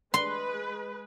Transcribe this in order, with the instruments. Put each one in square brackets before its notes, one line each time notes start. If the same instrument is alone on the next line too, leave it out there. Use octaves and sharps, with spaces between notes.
[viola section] G#3 B4 [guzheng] C6